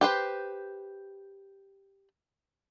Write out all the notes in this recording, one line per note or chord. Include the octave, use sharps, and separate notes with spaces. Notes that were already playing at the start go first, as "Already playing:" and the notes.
G4 B4 C5